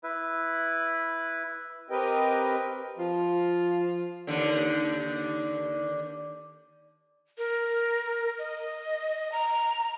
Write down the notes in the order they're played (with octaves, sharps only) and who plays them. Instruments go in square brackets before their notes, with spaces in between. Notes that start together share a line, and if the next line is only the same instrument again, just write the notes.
[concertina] E4 B4
[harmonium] C4 G4 A#4 B4 D#5 G5
[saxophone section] F3 F4
[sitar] D#2 D3
[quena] A#4
D#5
A#5